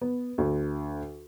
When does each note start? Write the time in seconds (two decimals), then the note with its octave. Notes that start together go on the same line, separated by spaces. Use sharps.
0.01 B3
0.38 D2